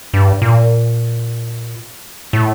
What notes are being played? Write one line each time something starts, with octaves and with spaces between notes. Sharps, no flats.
G2
A#2
A2